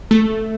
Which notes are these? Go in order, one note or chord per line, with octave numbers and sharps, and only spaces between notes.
A3